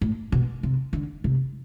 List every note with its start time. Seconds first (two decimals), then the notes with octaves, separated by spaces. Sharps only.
0.01 A2
0.32 B2
0.63 C3
0.93 D3
1.24 C3